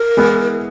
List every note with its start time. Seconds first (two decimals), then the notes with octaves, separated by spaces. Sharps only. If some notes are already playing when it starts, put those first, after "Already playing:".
Already playing: A#4
0.17 E3 G#3 B3 E4